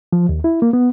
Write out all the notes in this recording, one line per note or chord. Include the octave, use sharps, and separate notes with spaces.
F3
D#2
E4
A#3
B3